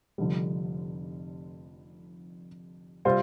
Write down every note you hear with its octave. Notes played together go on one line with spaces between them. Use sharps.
F1 F2 D3 G3
C3 G3 C4 F4 C5